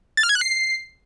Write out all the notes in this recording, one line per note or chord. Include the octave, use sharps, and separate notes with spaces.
A6
F6
G#6
F#6
C7